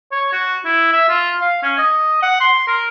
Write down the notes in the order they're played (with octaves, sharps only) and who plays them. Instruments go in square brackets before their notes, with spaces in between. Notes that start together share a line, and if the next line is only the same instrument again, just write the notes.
[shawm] C#5
F#4
E4
E5
F4
F5
C#4
D#5
F#5
C6
A#4